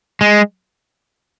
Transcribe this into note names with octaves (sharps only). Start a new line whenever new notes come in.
G#3